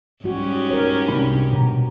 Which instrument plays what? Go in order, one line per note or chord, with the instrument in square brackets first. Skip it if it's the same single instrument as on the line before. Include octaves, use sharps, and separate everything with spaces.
[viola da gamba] G#2 C#4 G4 [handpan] G3 F#4
[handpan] A#4 C#5
[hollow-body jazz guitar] C2 D4 B5
B2 A#5